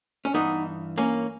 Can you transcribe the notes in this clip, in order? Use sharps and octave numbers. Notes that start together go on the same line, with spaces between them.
C#4
G2 E3 B3 D#4
A#3 C#4